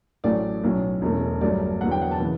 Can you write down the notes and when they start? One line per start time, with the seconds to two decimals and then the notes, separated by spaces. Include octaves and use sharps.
0.24 A1 A2 F#3 A3 C#4 D5
0.64 B1 A2 F#3 C#4
1.02 E1 E2 B2 A3 C#4
1.41 G1 G2 F#3 A3 D5
1.80 E2 D3 F#3 B3 D4 F#5
1.91 G5
2.01 F#5
2.11 A5
2.20 C#3 E3